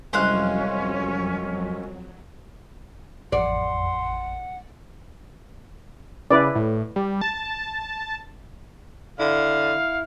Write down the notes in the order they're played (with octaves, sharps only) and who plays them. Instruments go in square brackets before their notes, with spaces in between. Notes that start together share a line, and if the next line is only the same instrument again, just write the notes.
[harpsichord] C2 G#3 [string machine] F2 F#3 [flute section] C#4 [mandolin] C5 F5 F#6
[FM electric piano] A1 F2 [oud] D5 [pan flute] F#5 [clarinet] C6
[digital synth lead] C#3 [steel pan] E4 B4 D5
[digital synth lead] A2
G3
A5
[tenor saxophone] D3 [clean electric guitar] E4 [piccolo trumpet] F5